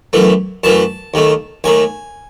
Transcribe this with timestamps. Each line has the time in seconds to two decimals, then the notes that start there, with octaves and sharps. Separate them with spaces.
0.13 F#2 E3 A3
0.64 F#2 E3 A3 A5
1.14 D#2 D#3 A3
1.64 D#2 D#3 A3 G#5